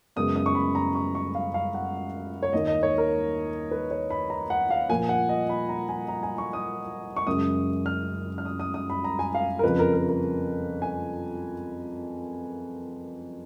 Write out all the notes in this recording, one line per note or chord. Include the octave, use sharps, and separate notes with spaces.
F#2 C#3 G#3 B3 D#6
D#6
C#6
B5
A#5
C#6
C#6
F5
F5
F#5
C#5
D#2 D#3 A#3 D#5
D#5
C#5
A#4
B4
C#5
B5
A#5
F#5
F5
A#2 F3 A#3 G#5
F#5
D#5
B5
A#5
G#5
A#5
G#5
C#6
D#6
C#6
F#2 C#3 G#3 D#6
F6
F6
D#6
D#6
D#6
B5
A#5
G#5
F5
A#4
F2 C#3 F3 B4
A#4
A#4
A#4
G#5